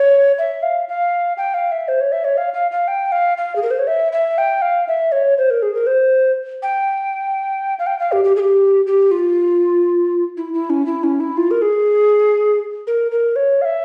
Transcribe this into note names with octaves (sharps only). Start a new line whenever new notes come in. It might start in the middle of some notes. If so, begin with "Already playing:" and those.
Already playing: C#5
E5
F5
F5
G5
F5
E5
C5
C#5
E5
C#5
F5
F5
F5
G5
F5
F5
G#4
A#4
C5
C#5
E5
E5
G5
F5
E5
C#5
C5
A#4
G#4
A#4
C5
G5
F5
G5
F5
G4
G4
G#4
G4
G4
F4
E4
E4
C#4
E4
C#4
E4
F4
A#4
G#4
A#4
A#4
C#5
F5
E5